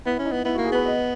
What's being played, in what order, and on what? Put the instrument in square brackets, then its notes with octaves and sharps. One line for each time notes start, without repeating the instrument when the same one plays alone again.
[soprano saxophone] B3 [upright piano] E4
[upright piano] E4
[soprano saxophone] C#4
[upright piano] D#4
[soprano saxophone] B3
[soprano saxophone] B3 [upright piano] E4
[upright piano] F#4
[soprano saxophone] A#3
[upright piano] G#4
[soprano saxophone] B3 [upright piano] B4
[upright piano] D#5